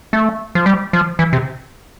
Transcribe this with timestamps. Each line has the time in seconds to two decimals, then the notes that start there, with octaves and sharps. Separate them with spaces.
0.13 A3
0.55 F3
0.66 G3
0.93 F3
1.19 E3
1.33 C3